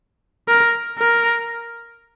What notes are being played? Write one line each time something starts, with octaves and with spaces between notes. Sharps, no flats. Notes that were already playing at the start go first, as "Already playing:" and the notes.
A#4
A#4